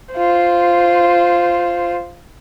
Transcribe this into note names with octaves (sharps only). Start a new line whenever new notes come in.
F4 C5